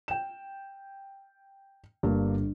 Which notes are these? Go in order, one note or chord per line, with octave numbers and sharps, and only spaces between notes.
G5 E7
G1 G2 A#3